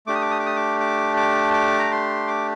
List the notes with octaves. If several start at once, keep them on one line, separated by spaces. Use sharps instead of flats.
A3 D4 G4 D6
D#6
D6
D#6
D6
D#6
D6
D6
D6
D6
A#5
C6
D6